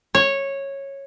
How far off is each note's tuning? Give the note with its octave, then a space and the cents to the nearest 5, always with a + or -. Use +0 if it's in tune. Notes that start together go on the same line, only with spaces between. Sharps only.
C#5 -10